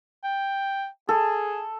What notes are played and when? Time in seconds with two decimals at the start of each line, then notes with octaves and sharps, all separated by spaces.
0.24 G5
1.09 G#4 A4